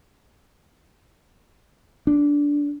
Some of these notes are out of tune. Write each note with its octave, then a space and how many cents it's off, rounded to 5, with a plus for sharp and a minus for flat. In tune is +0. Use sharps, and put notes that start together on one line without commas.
D4 -15